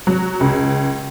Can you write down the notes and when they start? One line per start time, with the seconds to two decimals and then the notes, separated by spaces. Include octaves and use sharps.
0.07 F#3
0.40 C#2